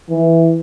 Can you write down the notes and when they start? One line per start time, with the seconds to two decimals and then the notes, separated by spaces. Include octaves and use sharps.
0.10 E3